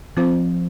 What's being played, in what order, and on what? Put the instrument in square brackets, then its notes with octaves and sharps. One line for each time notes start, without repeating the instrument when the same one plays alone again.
[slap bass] F3 [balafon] C4 F4 C5